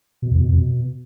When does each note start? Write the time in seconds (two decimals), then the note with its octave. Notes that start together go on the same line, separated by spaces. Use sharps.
0.22 B2
0.31 E2
0.40 B2
0.49 F2
0.57 B2